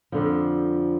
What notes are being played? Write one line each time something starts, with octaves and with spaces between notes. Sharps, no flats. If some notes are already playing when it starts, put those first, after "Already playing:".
F2 D3 F3